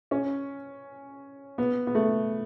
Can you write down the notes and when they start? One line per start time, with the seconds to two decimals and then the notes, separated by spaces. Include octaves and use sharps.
0.11 C#4
1.58 B3
1.87 B3
1.95 A3